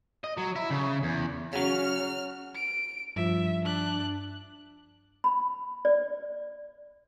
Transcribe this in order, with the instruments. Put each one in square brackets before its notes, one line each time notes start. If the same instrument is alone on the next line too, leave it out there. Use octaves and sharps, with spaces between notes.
[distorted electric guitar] D#5
F#3
E4
C#3
E2
[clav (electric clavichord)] C#3 F#3 [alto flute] C#4 [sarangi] F#4 [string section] F6
[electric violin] D7
[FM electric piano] G2 F3 [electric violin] E5
[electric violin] D4 F#6
[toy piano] B5
D5